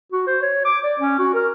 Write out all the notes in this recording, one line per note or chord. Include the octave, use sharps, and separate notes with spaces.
F#4
C5
C#5
D6
D5
C#4
F#4
A#4